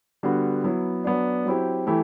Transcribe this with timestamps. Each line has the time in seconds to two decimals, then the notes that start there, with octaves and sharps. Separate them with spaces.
0.23 D3 G3 B3 F#4
0.64 F#3 B3 E4
1.04 F#3 B3 D4
1.46 F#3 C4 E4 G4
1.87 E3 A3 E4 G4